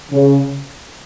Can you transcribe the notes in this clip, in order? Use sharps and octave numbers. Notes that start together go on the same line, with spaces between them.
C#3